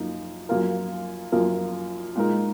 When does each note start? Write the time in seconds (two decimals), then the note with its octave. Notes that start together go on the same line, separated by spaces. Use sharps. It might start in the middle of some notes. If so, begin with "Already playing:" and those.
Already playing: F#2 F3 A#3 D#4
0.49 F#2 F3 A#3 F4 A#4
1.32 F#2 F3 A#3 F4 A#4
2.15 A#2 G#3 D#4 A#4